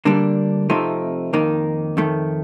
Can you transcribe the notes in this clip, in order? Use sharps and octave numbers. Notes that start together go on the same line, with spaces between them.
D3 G3 A#3 D4
C3 F3 A3 C4 D#4
F2 D#3 A#3 D#4
F2 D#3 A3